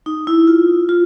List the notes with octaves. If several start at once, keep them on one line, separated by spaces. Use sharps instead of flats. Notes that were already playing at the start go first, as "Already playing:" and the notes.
D#4
E4
F4
F4